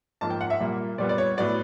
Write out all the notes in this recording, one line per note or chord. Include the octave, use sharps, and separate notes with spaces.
G#2 F3 A#3 A5
G5
F#5
E5
A#2 G3 A#3
A#2 G3 B3 D5
D5
C#5
A2 F#3 B3 D5